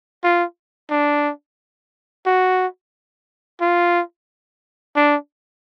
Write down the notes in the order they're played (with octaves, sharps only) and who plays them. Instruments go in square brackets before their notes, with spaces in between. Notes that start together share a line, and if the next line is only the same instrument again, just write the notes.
[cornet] F4
D4
F#4
F4
D4